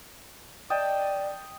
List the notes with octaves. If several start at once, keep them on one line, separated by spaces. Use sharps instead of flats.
D5 D#5 G5 A5